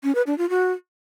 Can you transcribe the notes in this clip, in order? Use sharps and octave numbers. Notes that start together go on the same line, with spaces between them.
C#4
B4
D4
F4
F#4